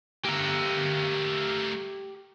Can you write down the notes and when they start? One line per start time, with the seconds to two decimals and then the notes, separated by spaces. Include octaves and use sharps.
0.25 A3 A#3 G4 A#5